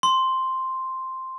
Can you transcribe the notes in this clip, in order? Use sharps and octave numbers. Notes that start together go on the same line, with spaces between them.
C6